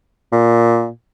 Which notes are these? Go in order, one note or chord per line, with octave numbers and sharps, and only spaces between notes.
A#2